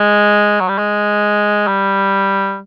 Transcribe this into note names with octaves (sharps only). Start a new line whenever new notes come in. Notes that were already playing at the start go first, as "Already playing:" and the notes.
Already playing: G#3
F#3
G3
G#3
G3